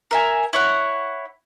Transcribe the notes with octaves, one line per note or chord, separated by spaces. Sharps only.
A#4 E5 G#5
E4 C#5 F#5